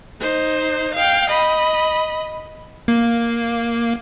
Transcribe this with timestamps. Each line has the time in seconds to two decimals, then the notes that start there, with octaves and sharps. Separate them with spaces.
0.21 D#4 C5
0.94 F5 G5
1.30 D#5 B5
2.88 A#3